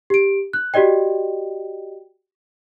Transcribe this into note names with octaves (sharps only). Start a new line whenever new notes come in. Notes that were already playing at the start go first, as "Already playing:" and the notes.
G4 D7
F#6
F#4 G4 D5 D#5 G5